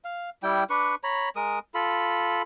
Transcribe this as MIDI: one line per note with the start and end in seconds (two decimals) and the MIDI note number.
0.04 0.30 77
0.43 0.64 55
0.43 0.64 64
0.43 0.64 79
0.70 0.95 62
0.70 0.95 71
0.70 0.95 85
1.04 1.29 73
1.04 1.29 82
1.04 1.29 83
1.36 1.59 56
1.36 1.59 70
1.36 1.59 87
1.75 2.42 65
1.75 2.42 69
1.75 2.42 83